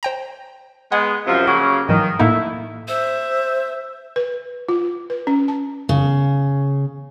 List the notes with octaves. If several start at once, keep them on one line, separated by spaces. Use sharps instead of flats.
C5 G5 A#5
G#3 B3 F#5
F#2 C3 F3
C#3 F#3 A#3 F#4
G#2 D#3 E3 F#3
A2 A3 A#3 D#4 E4
C5 E5
B4
F4
B4
C#4
A5
C#3